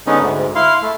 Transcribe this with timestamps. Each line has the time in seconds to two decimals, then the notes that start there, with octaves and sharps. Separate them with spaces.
0.07 D3 G#3 B3 C#4 D#4
0.21 D2 G#2
0.55 E4 F5 C6
0.82 A3